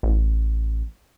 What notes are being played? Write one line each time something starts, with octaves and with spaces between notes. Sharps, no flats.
A1